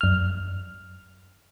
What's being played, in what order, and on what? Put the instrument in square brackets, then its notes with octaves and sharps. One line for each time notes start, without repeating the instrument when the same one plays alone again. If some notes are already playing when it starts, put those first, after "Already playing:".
[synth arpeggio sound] F#2 F6